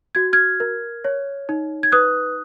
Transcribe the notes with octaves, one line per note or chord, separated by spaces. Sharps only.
F#4 G#6
F6 G#6
A#4
C#5
D#4
G#6
B4 D#6 F#6